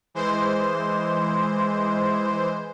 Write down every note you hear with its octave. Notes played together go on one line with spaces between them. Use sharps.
E3 G#3 C5